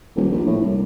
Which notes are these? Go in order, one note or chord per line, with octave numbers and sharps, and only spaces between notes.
D#1
A#1
A2
C2